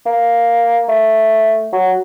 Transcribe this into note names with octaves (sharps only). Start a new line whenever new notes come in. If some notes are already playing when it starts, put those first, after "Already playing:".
A#3
A3
F#3